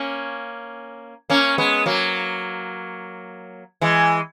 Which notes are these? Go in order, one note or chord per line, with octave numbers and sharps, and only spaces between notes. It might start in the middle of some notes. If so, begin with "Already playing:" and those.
Already playing: A#3 C#4
A#3 C#4
G#3 B3
F#3 A#3
E3 G#3